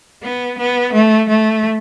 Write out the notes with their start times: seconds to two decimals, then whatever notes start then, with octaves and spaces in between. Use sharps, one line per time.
0.23 B3
0.58 B3
0.93 A3
1.28 A3